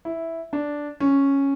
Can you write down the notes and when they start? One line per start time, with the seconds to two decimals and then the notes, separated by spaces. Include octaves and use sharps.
0.05 E4
0.53 D4
1.00 C#4